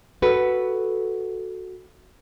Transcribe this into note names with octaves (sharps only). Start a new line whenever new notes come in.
F#4 A4 B4